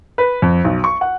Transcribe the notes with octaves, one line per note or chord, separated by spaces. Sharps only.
B4
F2
B1
C#6
F#5